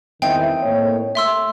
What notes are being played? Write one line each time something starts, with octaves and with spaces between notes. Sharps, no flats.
E2 D#3 C4 D#4 E4 G5
A2 A#3 C#5
A3 E5 C6 E6